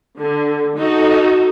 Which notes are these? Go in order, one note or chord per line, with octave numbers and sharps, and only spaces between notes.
D3
D#4 F#4 A4